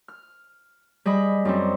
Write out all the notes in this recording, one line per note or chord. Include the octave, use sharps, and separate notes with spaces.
F6
G3 G#4 D#5 B5
F#2 G3 C4